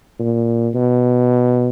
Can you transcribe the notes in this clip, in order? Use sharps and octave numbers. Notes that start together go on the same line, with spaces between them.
A#2
B2